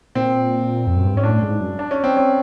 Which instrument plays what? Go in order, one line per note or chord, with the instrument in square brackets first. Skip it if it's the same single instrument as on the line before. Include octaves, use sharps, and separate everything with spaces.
[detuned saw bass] A#2 [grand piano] C4
[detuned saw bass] F2
F#2
G2
[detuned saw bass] G#2 [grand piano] C#4
[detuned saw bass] A2 [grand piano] D4
[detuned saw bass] G#2
F#2
[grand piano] D4
C#4
C4
C#4